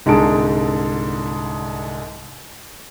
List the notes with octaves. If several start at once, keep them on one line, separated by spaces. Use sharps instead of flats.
C2 G#2 D3 G#4 A5 D7